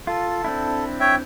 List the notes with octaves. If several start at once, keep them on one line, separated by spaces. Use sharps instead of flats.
F4 A4
C4 D4 E4
C#5 E5 G5